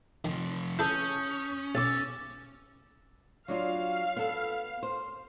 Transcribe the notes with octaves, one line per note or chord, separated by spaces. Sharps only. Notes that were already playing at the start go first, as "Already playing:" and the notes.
C3 D#3 F3
C#4 E4 A4 B4 D#6 G6
B1 D6 E6 A6
F#3 D4 F4 F5
B3 A4
C5